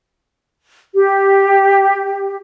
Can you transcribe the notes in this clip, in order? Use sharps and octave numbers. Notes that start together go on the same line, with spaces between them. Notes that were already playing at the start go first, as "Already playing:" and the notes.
G4